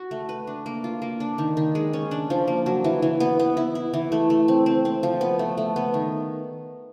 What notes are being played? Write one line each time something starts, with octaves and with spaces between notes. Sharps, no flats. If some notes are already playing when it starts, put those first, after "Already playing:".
Already playing: F#4
A3
B4
D4
A#3
F4
A#3
D4
D#3
D#3
G#3
C#4
D4
F3
A#3
F#3
E3
E3
B3
B3
E4
E4
E3
A3
A3
C4
C4
C4
F3
B3
A3
A3
B3
D#3